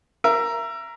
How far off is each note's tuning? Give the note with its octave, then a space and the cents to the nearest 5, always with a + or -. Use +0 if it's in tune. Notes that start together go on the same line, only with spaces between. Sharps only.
A#4 +5 E5 +25